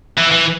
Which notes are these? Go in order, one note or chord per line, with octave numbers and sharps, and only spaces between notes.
E3
E3